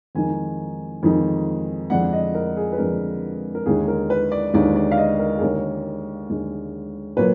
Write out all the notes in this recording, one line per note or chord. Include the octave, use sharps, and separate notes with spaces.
F2 D#3 G#3 D#4 G#5
F2 D#3 G#3 D#4
F2 D3 G#3 D4 F#5
D#5
A#4
G#4
B4
F2 D3 G#3 D4 A#4
A#4
D#2 D3 G#3 D#4 G#4
A#4
B4
D5
D#2 D3 G#3 D#4 D5
D5
F5
D#5
A#4
G#4
D#2 D3 G#3 A#4
D#2 D3 G#3
A#2 F#3 A#3 B4